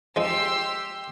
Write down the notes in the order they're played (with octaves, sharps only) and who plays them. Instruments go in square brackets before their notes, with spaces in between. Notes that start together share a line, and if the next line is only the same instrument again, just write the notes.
[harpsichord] F3 G#3 D#4 [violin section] G4 C6 E6